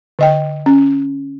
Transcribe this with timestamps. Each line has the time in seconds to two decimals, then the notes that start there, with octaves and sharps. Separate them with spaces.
0.19 D3 D#5 G5
0.66 C#4